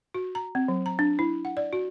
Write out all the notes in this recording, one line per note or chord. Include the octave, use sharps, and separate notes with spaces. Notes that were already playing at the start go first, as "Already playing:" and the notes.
F#4
A#5
C4
F#3
A#5
D4
E4
F#5
D5
F#4